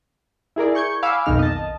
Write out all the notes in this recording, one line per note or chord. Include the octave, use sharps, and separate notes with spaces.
E4 G#4 A#4 D5
C#6 G6 G#6 C#7
F5 G#5 B5 D6 E6
B1 F2 D#3 D#4 F6
D#5 A5